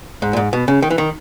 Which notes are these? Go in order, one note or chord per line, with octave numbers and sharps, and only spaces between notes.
G#2
A#2
G#2
B2
C#3
D#3
E3
D#3